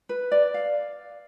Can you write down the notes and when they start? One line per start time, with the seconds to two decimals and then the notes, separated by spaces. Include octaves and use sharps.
0.09 B4
0.32 D5
0.54 F5